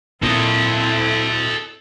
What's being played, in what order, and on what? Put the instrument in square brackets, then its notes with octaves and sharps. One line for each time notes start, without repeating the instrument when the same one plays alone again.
[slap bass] A#2 [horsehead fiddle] C4 E4 [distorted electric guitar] A4 D#5